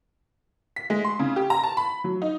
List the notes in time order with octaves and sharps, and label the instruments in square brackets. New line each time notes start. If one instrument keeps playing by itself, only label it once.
[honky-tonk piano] B6
G#3
C6
C#3
G4
A#5
A5
B5
F#3
D#4